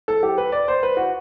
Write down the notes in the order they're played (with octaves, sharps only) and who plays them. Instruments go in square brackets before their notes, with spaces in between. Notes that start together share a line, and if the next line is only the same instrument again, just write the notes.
[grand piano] A4
G4
B4
D5
C5
B4
F#4